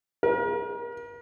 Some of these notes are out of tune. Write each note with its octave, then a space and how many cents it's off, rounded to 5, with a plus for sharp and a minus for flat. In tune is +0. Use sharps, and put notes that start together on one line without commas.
A#4 +35